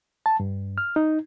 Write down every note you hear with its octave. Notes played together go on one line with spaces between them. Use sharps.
A5
G2
F6
D#4